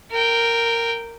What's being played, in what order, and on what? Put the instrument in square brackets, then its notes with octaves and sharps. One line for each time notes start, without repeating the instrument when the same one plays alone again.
[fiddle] A#4 G5